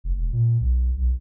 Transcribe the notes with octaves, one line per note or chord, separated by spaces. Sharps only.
F1
E1
A#2
B1
B1